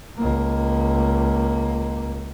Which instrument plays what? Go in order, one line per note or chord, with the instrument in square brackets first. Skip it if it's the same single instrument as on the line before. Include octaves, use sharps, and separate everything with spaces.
[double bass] C#2 A#3